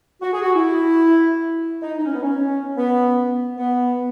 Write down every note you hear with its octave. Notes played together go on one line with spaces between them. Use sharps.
F#4
G#4
F#4
E4
D#4
D#4
C#4
B3
C#4
B3
B3